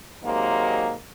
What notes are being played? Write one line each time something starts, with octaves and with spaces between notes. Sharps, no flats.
C3 D#3 F#3 G#3 A#3